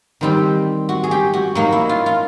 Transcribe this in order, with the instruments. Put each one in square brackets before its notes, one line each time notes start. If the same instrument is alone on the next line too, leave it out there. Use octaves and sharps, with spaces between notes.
[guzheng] D#3 G3 C4 G4
F#4
G#4
G4
F#4
F#3 A#3 D#4
E4
F4
F4